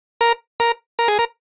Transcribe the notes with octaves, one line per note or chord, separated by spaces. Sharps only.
A#4
A#4
A#4
G#4
A#4